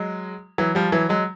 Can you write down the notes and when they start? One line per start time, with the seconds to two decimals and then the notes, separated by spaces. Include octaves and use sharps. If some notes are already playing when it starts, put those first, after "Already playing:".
Already playing: F#3 G#3
0.58 E3 F#3
0.75 F3 G3
0.92 E3 F#3
1.09 F#3 G#3